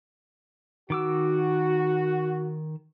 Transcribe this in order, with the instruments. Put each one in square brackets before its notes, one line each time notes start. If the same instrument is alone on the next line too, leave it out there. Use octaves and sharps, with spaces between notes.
[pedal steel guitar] D#3 D6 E6 [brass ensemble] F#4